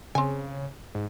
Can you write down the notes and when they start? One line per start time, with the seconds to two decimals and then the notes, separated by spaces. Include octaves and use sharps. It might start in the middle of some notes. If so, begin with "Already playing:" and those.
0.15 C#3 C4 G#5
0.95 G#2